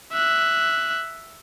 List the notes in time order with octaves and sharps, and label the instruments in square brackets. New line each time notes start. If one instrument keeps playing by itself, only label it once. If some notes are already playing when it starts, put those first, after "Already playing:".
[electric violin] E5 F#6